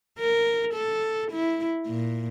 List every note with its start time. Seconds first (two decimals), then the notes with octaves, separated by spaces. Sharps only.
0.19 A#4
0.74 A4
1.31 E4
1.87 A#2